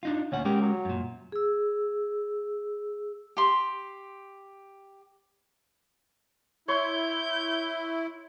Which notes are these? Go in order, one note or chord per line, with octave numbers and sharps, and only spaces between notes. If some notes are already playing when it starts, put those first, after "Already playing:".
D4 D#4 F4
D2 A#2 C#4 F#5
G#3 C#4 G4 A#4
F#3
F#2 A#2
G#4 E6
G4 C6
E4 C#5 C6 G6